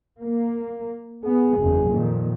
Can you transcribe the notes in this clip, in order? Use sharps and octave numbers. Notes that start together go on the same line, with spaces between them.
A#3
B3 G#4
F#1 E2
F2 A#2 D#3